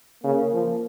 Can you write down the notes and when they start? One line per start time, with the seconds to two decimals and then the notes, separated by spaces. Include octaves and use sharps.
0.23 C#3 A#3
0.53 F3